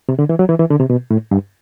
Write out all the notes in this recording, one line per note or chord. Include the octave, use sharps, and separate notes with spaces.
C3
D3
E3
F#3
E3
E3
D3
C3
B2
A2
G2